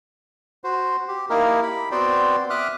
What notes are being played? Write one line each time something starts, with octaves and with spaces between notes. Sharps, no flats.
F#4 C5
G4
A#3 D#4 E4 G4 A#4
B5
B3 C4 F#4 C5 D5 G5
E5 D6 D#6 F6 F#6